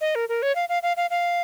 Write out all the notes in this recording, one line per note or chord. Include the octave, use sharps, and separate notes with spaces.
D#5
A#4
A#4
C#5
F5
F5
F5
F5
F5